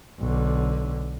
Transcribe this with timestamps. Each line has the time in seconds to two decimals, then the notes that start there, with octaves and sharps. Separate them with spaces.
0.20 B1 D3